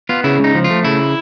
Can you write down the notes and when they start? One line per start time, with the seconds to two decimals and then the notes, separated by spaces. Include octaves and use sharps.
0.09 B3 F4
0.24 C#3 E4
0.39 C#2
0.44 D#4
0.55 F3
0.64 F4
0.70 A3
0.84 C#3 E4